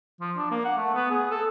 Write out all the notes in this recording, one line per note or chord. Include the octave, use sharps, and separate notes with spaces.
F3
D4
A#3
F#5
A3
B3
G#4
A4